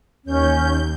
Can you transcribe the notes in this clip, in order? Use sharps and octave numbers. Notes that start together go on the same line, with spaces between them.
D#2 C#4 G6